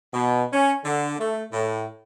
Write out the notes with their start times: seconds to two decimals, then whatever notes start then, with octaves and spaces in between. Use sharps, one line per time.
0.13 B2
0.52 C#4
0.84 D3
1.19 A3
1.52 A2